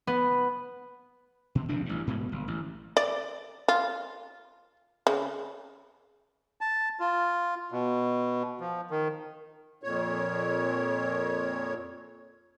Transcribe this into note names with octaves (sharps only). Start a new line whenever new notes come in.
B3
B2
F1 E2 D4
A1 G2
G#2 B2
G1
A1
D5
F4
C#3
A5
F4
B2
F3
D#3
F2 A#2 C#5